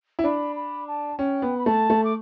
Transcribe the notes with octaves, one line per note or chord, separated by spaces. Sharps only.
E4
D4 B5
B5
A5
C#4 G5
B3
B5
A3 A5
A3
D6